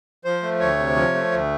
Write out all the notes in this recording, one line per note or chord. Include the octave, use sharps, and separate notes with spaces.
F3 C5
A3
D2 C#5
C3
F3
A3
D2